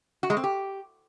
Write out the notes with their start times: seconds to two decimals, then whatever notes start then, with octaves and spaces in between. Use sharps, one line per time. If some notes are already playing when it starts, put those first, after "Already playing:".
0.23 F#4
0.30 G#3
0.37 C4
0.44 G4